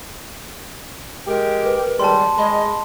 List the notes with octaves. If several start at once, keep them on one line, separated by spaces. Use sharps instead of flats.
G#3 G4 A#4
B4
D#2 G3 G#3 A5 C6
G#3 D#5 B5